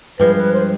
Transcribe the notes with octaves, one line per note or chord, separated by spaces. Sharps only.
G2 F3 G#3 B4
B4
C5